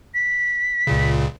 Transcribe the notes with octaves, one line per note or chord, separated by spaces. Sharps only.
B6
C#2 A#2 C#3